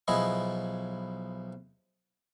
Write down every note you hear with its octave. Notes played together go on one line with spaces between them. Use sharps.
B1 F3 B3 E4 G#4 D#5